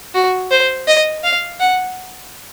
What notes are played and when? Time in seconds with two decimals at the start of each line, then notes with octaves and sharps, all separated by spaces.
0.15 F#4
0.51 C5
0.88 D#5
1.24 F5
1.60 F#5